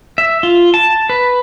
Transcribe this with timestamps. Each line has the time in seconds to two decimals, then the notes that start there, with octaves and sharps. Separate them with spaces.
0.18 E5
0.43 F4
0.74 A5
1.09 B4